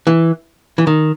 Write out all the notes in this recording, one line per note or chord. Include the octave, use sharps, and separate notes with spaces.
E3
E3
D#3